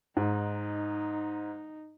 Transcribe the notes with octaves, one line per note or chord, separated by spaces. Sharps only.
G#2 D#4